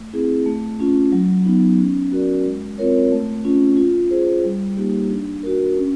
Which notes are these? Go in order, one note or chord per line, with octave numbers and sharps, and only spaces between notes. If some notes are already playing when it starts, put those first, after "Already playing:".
Already playing: A3
C4 E4 G#4
A3
C#4 F4
F#3
B3 D#4
C#4
F#4 A#4 D5
G#3
C4 F4 A#4 C#5
A3
C#4 F4
F4
G#4 C5
G3
A#3 D#4 G4
D4
F#4 A#4
C#4